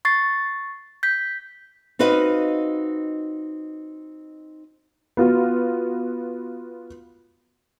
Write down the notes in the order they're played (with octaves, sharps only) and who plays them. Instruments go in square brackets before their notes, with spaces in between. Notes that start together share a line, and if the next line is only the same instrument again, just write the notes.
[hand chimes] C#6 A6 C7
G6 B6
[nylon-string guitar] C4 D#4 F#4 B4 D#5 F5
[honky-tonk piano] B3 F4 F#4